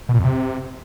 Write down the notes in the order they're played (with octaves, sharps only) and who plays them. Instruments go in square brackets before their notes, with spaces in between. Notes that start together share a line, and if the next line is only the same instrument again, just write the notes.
[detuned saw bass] B2
A#2
F2
C3